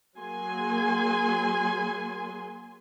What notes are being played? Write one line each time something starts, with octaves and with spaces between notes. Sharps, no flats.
F#3 A#3 G#4 G#5 C6